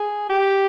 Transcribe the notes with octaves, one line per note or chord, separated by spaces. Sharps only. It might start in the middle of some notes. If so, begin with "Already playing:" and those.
Already playing: G#4
G4